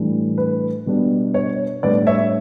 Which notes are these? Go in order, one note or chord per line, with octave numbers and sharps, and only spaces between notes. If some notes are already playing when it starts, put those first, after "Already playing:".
Already playing: A2 E3 G3 D4
B4
B2 G3 B3 D4
C#5
A2 G3 D4 B4 D5
C#5 E5